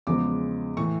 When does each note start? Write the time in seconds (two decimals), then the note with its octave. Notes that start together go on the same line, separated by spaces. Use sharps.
0.07 E2 C#3 F3 G#3 D6
0.77 A2 E3 C#6